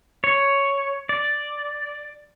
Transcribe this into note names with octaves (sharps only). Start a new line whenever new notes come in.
C#5
D5